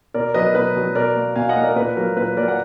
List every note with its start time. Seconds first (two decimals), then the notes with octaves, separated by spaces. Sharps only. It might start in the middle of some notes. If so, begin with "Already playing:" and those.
0.14 B2 A#4 D5
0.34 F#3 B3 B4 D#5
0.46 A#4
0.55 B2 B4
0.75 F#3 B3
0.95 B2 A#4 D5
1.16 A#3
1.35 B2 F5 G#5
1.49 D#5 F#5
1.56 A#3
1.63 A#4 D5
1.76 A#2 B4
1.97 F#3 A#3 A#4
2.16 A#2 B4
2.37 F#3 A#3 A#4 D5
2.48 F#5